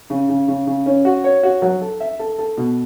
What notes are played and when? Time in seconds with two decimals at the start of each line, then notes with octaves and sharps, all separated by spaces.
0.10 C#3
0.29 C#3
0.48 C#3
0.67 C#3
0.86 C#4
1.05 F#4
1.24 C#5
1.43 F#4
1.62 F#3
1.81 A4
2.00 E5
2.19 A4
2.38 A4
2.57 B2